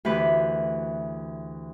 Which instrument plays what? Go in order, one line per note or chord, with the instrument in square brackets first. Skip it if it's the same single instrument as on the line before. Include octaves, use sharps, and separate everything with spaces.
[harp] D2 E3 G4 B4